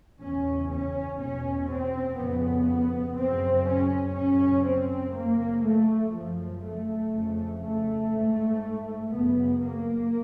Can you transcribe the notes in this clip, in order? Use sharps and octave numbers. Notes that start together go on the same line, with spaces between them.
E2 C#3 C#4
C#4
E2 B2 C#4
C4
F2 C#3 B3
F#2 C#3 C4
C#4
F#2 C#3 C#4
C4
F#2 C#3 A#3
A3
F#2 C#3 F3
A3
F2 C#3
A3
G#2
F#2 C#3 B3
A#3